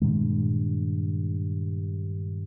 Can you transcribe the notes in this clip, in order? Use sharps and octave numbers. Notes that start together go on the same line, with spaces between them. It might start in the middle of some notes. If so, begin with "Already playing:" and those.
G2 A#2 D#3 G#3